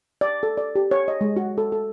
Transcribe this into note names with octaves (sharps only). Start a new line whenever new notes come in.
D5
A4
D5
G4
C#5
D#5
G#3
F#4
A4
A4